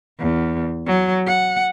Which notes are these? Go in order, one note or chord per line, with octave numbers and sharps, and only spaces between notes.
E2
F#3
F#5